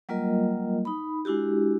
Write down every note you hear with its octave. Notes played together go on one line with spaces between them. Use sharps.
F#3 G3 A#3 F4 A#4 D#5
D#4 B5
G#3 D4 E4 F#4 G4